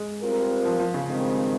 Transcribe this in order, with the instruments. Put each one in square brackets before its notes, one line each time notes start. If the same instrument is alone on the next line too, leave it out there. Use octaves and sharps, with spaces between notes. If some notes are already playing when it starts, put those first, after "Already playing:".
Already playing: [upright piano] G#3
[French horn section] G3 C4 F4 A#4
[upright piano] F3
F3
C#3
[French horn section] G2 D#3 G#3 C4